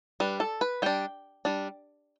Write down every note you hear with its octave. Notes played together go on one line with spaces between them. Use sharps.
G3 D4 B4
A4
B4
G3 D4 G5
G3 D4